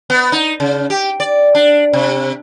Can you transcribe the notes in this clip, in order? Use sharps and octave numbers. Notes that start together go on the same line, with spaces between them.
B3
D#4
C#3
G4
D5
D4
C3